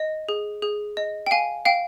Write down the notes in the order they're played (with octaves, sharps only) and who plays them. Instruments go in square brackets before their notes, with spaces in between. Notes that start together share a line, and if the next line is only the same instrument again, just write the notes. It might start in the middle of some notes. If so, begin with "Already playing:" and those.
Already playing: [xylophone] D#5
G#4
G#4
D#5
G5
F5 G#5
F5 G5